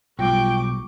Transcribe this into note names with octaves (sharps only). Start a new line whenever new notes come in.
B1 G3 F4 G4 G5 C#6 D6